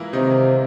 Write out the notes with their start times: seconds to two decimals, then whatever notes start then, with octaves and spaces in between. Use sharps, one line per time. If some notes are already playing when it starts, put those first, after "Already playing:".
Already playing: E3 G#3 A#3 E4 F4 A#4
0.13 C3 D#3 D#4